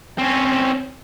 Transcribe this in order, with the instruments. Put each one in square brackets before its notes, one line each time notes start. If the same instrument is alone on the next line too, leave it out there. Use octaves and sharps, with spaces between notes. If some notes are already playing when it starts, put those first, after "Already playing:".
[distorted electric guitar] C4 C#4